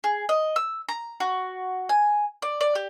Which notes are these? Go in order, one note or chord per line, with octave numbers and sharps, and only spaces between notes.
G#4
D#5
E6
A#5
F#4
G#5
D5
D5
G4